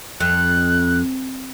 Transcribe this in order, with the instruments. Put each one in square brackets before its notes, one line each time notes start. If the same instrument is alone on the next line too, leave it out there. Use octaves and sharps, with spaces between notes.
[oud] F2 [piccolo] F#6